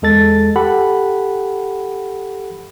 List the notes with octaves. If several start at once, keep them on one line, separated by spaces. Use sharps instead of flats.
E2 G#3 A4 A6
G4 A4 F#5 B5